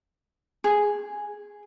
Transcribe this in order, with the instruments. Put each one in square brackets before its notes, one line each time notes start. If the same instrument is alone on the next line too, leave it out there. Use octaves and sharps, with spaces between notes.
[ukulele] G#4